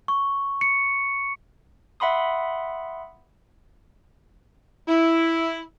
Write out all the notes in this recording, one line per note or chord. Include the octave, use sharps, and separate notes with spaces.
C#6
C#7
E5 F#5 B5 C6 D#6
E4